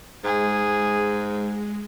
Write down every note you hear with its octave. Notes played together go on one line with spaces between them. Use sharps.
G#2 G#3 G#4